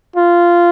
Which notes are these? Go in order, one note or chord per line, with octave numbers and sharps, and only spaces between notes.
F4